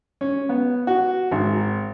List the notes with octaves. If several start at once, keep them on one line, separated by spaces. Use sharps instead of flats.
C#4
B3
F#4
G#1